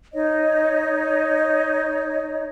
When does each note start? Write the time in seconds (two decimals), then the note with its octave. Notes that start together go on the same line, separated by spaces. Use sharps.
0.14 D#4 C#5 D#5